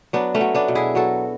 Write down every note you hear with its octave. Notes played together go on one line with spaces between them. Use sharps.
F#3 B3 D4
A3 C#4
F#3
B3 D4
B2
E4 G#4
F#3 F#4 A4